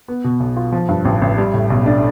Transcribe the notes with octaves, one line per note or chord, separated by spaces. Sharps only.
B3
B2
B1
F4
F3
G2
A1
A1
G3
A2
B1
D4